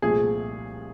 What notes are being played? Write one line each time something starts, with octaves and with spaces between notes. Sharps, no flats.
C2 A#2 F3 A3 G#4